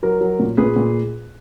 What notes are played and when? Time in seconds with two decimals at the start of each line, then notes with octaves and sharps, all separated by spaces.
0.03 F#3 A#4
0.21 F#3
0.39 A#2
0.57 A#2 G#4 B4
0.76 A#2